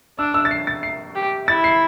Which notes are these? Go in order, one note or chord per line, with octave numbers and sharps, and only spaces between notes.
D4 E6
E6
A6
C7
A6
C7
G4
E4 A6
C7